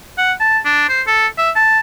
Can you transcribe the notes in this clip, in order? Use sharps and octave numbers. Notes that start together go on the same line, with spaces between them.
F#5
A5
D4
C5
A4
E5
A5